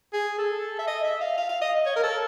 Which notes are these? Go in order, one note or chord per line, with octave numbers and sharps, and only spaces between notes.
G#4
A4
E5
D#5
E5
F5
F5
F5
D#5
C#5
A#4
A4